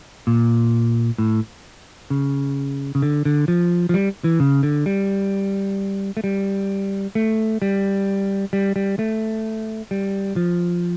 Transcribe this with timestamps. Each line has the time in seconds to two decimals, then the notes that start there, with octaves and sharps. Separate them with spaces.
0.27 A#2
1.18 A2
2.10 C#3
2.95 C#3
3.02 D3
3.25 D3
3.48 F3
3.89 F3
3.94 G3
4.24 E3
4.40 C#3
4.63 D3
4.86 G3
6.17 A3
6.24 G3
7.15 A3
7.62 G3
8.53 G3
8.76 G3
8.99 A3
9.91 G3
10.36 F3